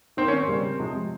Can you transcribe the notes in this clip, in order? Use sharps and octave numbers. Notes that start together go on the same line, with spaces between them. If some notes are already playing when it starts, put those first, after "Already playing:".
D#3 A#3 C4
C#4
C4
C#3 G3 A#3
C3 F3 G#3